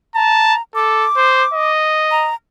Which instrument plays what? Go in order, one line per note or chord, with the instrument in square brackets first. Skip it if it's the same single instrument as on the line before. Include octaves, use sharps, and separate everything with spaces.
[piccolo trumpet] A5 [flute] A#5
[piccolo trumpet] A4 [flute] D6
[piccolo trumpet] C5
D#5
[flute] A#5